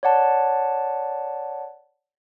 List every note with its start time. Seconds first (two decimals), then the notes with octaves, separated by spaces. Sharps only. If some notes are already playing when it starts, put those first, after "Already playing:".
0.03 C#5 D5 F#5 A5